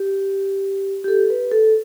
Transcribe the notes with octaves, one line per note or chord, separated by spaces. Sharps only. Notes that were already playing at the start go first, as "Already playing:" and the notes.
Already playing: G4
G4
A4
B4
A4